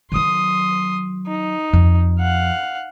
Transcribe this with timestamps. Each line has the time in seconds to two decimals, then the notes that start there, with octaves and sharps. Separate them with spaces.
0.12 D#3 F#3 C6 D#6
1.27 D#4
1.73 F2
2.20 F5 F#5